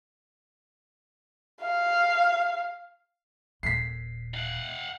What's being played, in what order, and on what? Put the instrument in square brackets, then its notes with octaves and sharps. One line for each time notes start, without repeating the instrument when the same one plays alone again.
[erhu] F5
[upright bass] D#1 A#2 [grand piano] B6 C7
[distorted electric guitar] F5 F#5